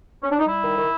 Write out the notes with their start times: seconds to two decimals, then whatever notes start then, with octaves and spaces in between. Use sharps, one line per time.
0.23 C#4
0.31 D4
0.39 D#4
0.47 G3 E4
0.63 D#3
0.77 D#3